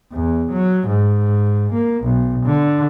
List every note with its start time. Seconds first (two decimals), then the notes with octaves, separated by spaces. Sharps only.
0.13 E2
0.51 F#3
0.87 G#2
1.73 A#3
2.04 B1
2.46 D3